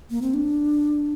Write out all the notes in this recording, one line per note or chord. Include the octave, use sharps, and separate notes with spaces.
A#3
C4
D4